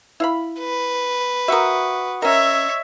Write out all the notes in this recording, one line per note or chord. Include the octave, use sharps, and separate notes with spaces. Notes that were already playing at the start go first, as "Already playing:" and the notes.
E4 F5 B5
B4
F#4 A#4 E5 F#5 D#6
C#4 A#4 C#5 D#5 E5 E6